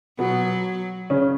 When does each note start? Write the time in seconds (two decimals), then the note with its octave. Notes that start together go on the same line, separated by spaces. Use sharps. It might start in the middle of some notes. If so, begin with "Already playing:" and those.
0.19 B2 F#3 B3
1.10 C#3 C#4